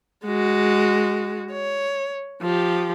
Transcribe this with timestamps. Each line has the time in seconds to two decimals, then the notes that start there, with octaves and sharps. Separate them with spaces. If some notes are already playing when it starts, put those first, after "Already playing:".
0.24 G#3 F#4
1.52 C#5
2.42 F3 G4